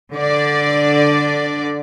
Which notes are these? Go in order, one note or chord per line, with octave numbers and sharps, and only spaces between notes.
D3 D5